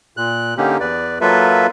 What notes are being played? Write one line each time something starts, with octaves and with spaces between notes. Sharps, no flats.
A#2 F#6
D3 A#3 C#4 D#4 G4
E2 B4 D5
F#3 A#3 F4 A4 B4 E5